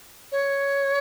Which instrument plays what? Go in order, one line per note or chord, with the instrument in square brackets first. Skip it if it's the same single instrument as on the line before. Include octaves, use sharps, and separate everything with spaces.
[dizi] C#5